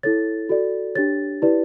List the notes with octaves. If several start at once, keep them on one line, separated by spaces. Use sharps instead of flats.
E4 A4 C#5 A6
F#4 A4 D5
D4 G4 C#5 A6
E4 G4 B4 D5